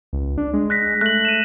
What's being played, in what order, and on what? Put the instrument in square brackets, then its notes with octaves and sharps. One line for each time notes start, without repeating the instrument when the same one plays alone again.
[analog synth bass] C#2
D4
G#3
[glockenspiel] F#6 A#6 B6
[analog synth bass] A3 [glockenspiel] F#6 F#7
[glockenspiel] D#7 E7